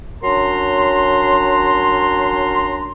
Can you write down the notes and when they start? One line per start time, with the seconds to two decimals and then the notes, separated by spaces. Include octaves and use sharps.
0.23 F#3 C#4 D4 A#4 A#5 C6